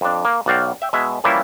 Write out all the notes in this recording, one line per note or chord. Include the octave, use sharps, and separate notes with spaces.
F2 D4
A#3
B1 F#4 D5 F5 G5
E5 G5
B2 G#3 E5
E3 F3 G3 A#3 C#4 E4